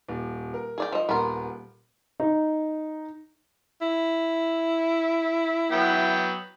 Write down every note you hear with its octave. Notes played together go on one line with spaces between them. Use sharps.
D#1
A#4
G#4 D5 G5
F3 D#5
D#1 B3 A#4 C6
D#4
E4
F#3 B3 G5